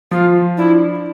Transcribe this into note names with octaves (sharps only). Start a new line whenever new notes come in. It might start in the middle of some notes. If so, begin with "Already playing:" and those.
F3 F4
D4 E4